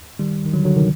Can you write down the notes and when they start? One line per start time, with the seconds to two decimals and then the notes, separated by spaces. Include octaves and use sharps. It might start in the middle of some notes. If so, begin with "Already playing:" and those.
0.19 D#3 G3
0.46 D#3
0.54 D3 F#3
0.65 D3 F#3
0.76 C3 D#3